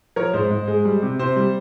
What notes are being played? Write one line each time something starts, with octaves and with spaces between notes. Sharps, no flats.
F3 A#4 C#5
G#2 C5
G#2
G#3
G3
C3
C3 C5
G3